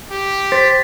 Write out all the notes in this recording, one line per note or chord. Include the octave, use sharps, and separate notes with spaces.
G4
C5 A6 B6